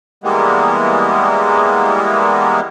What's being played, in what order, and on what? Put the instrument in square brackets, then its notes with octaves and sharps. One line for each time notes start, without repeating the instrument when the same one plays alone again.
[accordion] E3 G3 G#3 A#3 B3